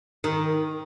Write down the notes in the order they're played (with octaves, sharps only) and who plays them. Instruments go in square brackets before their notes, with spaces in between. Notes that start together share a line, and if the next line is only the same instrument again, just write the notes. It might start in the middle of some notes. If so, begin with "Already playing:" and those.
[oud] D#3